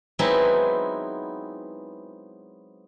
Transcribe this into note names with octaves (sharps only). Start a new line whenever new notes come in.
F#3 G#3 B3 C4 D#4 E4